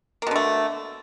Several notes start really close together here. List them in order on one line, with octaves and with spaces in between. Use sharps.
A#3 B2 D3 A3